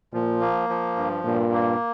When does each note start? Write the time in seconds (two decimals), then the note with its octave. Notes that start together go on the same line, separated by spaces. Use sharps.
0.13 A#2 F3
0.41 A#3
0.69 F3
0.96 G2
1.25 G2 A#2
1.52 A#3